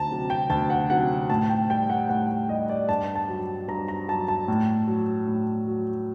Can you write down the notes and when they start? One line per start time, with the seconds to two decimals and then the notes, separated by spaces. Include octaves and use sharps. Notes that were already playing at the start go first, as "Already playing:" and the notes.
Already playing: D2 A5 A#5
0.10 C3 F#3
0.30 G5
0.50 D2 A5
0.70 F#5
0.90 C3 F#3 F#5
1.30 A2 A5
1.50 G5
1.69 G3 G5
1.90 F#5
2.09 A2 F#5
2.49 G3 D#5
2.69 D5
2.89 G2 A5
3.15 A5
3.28 F#3
3.68 G2 A#5
3.88 A#5
4.08 F#3 A5
4.28 A5
4.48 A2
4.87 F#3
5.27 A2
5.67 F#3